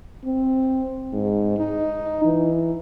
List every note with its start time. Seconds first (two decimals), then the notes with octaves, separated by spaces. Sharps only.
0.24 C4
1.13 G#2
1.57 D#4
2.25 E3